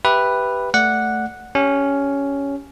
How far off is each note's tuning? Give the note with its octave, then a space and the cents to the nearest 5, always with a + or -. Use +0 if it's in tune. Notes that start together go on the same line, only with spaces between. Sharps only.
G4 +0 B4 +0 E5 +0
A3 +0 D5 +0 F#5 -5
C#4 +10 G4 +0